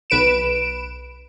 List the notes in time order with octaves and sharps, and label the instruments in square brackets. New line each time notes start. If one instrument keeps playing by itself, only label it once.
[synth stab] B1 B4 D7 E7